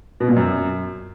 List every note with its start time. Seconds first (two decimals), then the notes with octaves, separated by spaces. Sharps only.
0.20 B2
0.28 A#2
0.36 F#2